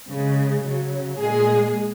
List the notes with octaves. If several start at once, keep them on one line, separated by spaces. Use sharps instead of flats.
C#3 G#3
C#3 F#3
A#2 G#3 G#4